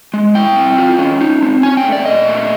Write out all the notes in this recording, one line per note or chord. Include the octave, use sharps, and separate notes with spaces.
G#3
E4 G5
C4
F4
C#4
D#4
C4
C#4 G#5
G5
A3
D5
A#2 D#5
A3